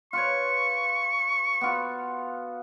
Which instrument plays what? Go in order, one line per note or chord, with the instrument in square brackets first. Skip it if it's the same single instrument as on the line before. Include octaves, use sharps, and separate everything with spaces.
[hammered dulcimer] F4 B4 C#5 [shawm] C#6
[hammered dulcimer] B3 F4 F#4